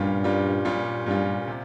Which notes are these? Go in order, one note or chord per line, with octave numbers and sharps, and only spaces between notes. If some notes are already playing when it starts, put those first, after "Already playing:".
Already playing: G2 A#2 G3 C#4 F4
A#2 G3 C#4 F4
A#2 G3 C#4 F4
G2 A#2 G3 C#4 F4
C3